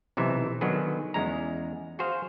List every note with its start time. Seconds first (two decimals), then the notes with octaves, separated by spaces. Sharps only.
0.17 B1 C3 E3 E5
0.61 D3 D#3 F#3 B3 G#4
1.14 E2 G#3 C#4 A#5
1.99 F#4 G#4 C5 F5